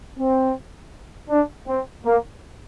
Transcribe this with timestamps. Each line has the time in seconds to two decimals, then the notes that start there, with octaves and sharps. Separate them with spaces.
0.18 C4
1.30 D4
1.67 C4
2.05 A#3